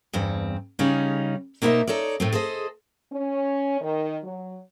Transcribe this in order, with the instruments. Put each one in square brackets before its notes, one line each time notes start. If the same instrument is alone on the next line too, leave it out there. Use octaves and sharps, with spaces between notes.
[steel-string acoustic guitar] E2 G2 C4
C#3 G3 C#4 D#4
B2 A#3 D#4 F4 C5 E5
D#4 A4 C#5 D5
A2 A3 C4
G#4 A4 C5 D#5
[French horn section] C#4
D#3
F#3